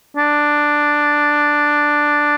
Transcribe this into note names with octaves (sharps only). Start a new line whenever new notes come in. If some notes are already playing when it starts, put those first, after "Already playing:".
D4